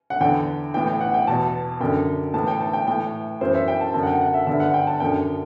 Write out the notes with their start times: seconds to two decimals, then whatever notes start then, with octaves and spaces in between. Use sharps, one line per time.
0.10 F#5
0.20 E2 D3 G5
0.74 A2 E3 G5
0.87 G5
1.01 F#5
1.14 G5
1.27 E2 B2 A5
1.80 F#2 D3 G5
2.34 A2 E3 A5
2.47 G5
2.61 A5
2.73 G5
2.87 A2 E3 G5
3.41 F#2 E3 C5
3.55 E5
3.68 G5
3.81 A5
3.94 F#2 D3 A5
4.03 F#5
4.07 G5
4.21 F#5
4.34 E5
4.47 G2 D3 E5
4.60 F#5
4.74 G5
4.87 A5
5.00 F#2 D3 G5